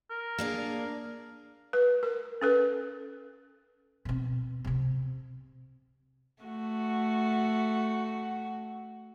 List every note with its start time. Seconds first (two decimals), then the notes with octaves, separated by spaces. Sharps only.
0.10 A#4
0.38 A#3 D4 G#4
1.73 B4
2.03 A#4
2.41 C#4 A4 B4
4.05 B2 C4
4.65 C3 C4
6.43 A3 F#4